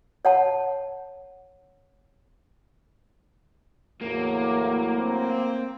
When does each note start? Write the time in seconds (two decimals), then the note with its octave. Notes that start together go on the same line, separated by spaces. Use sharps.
0.25 C#5 F#5 A5
4.01 E2 A2 F#3 A#3
4.98 C4